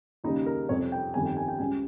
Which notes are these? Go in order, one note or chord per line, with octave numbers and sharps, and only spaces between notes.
D#2 C#3 G3 D#4
A#4
F2 C3 G3 C#5
G5
G1 F2 D#3 G3 G#5
G5
G#5
G5
C#2 C#3 G3 G#5